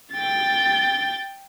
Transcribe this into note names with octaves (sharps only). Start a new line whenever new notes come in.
G5 A6